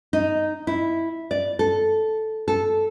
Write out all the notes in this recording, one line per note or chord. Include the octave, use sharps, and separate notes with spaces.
D#4
E4
D5
A4
A4